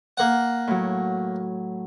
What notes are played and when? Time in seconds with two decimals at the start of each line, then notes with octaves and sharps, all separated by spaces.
0.17 A#3 F#5
0.68 A2 F#3